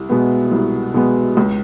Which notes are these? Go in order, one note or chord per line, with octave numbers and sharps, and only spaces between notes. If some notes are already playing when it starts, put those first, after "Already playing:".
Already playing: C2
B2 G#3 B3
C2
B2 G#3 B3
C#2